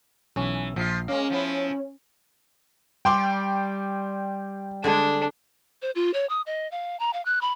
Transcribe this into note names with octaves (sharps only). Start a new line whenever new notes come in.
B1 E3 C#4
A#1 F3 F4 C7
G#3 A#3 C#4 F5
F3 B3 E4
G3 G5 C6 D6
D3 G#3 D4 G#4
C5
F4
C#5
D#6
D#5
F5
A#5
F5
F#6
B5